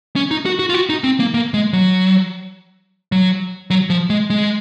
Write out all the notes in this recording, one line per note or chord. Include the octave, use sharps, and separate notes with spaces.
C#4
D#4
F#4
F#4
F4
F#4
D#4
C4
A#3
A#3
G#3
F#3
F#3
F#3
F3
G#3
G#3